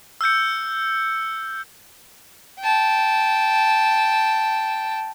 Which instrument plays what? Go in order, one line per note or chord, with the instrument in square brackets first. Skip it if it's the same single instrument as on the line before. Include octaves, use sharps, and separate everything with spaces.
[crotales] E6 F6 G6 C#7
[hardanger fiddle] G5 A5